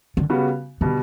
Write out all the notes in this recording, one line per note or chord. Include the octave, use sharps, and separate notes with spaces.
D3
C#3 G3 B3 F#4
B2 D3 G3